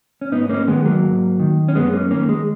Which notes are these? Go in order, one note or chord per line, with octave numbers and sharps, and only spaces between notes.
C#4
G#2 B3 D#4
A#3 C#4
D#3 G#3 B3
F#3 A#3
G#2
D#3
C#4
F#2 G#3 B3
A#3 C#4
D#3 A#3 C#4
G#3